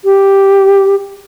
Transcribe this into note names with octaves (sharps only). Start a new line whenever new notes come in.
G4